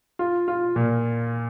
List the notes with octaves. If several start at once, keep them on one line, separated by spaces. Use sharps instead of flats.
F4
F4
A#2